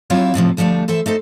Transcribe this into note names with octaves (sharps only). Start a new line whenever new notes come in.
F#3 C4 E4 F4 C#5 F5
F2 A2 C3 F3
D2 F3 G3 A3 D4
E3 A4 C5 E5
A3 D#4 A4 C5